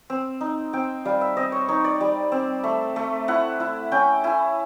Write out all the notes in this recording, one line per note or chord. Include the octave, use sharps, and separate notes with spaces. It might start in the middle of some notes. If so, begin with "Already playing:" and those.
C4
D#4
C4 G5
G3 F5
E5
C4 D#5
C#5
D#4 C#5
D5
G3
C4
A3
A3
E4 F#5
E4
C#4 G5
E4 G#5